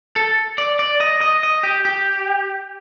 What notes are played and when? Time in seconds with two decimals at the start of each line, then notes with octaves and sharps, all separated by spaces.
0.16 A4
0.58 D5
0.79 D5
1.00 D#5
1.21 D#5
1.43 D#5
1.63 G4
1.85 G4